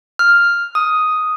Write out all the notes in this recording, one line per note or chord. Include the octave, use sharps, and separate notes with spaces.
F6
D#6